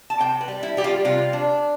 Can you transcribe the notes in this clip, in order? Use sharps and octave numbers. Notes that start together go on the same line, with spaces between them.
A5
C3 G5
B4
G3
E4
G3 G4
F4
C3 F4
D4